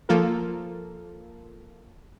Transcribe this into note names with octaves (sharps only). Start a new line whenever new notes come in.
F3 A#3 F4 A4 A#4